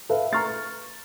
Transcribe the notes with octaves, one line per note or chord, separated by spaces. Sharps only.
A4 B4 E5 F5
A#5 C#6 F6 A6 C7